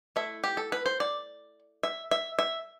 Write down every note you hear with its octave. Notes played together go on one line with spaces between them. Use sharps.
A3 E4 E5
G4
A4
B4
C5
D5
E5
E5
E5